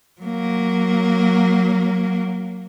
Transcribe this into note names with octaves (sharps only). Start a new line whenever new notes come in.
F#3 A#3